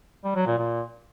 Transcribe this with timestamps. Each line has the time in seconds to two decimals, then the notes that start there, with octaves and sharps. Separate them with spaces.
0.24 G3
0.35 F#3
0.47 A#2
0.58 A#2